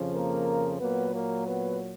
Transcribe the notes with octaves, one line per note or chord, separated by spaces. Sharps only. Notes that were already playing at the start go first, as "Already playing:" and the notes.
Already playing: F2 C#3 F3
A#3 A#4
A#2 F#3 A#3 B3 B4
A#3 A#4
B3 B4